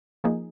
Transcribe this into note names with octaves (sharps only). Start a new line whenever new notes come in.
F3 A#3 D#4 G#4